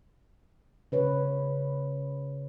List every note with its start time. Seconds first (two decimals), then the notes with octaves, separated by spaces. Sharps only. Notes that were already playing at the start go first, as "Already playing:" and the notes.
0.92 C#3 B4 C#5